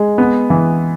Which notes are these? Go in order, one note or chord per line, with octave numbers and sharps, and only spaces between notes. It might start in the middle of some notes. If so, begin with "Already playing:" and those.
Already playing: G#3
B3
E3